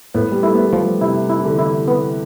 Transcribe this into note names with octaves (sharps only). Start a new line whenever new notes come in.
A2 B3
G3
A3 E4
B3
A3
F3 G3
C3 E4
E4
E3
D3
E4
B3